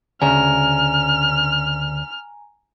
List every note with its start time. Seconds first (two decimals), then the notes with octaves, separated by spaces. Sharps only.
0.22 D2 C#3 G#5 A#5 F6